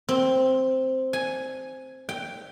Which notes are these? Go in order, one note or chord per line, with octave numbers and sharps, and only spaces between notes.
C4
G#5
G5